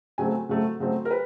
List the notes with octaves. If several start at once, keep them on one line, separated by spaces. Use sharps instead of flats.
C#3 F#3 A3 C4 G#5
C#3 F#3 A3 C4
C#3 F#3 A3 C4
A#4
B4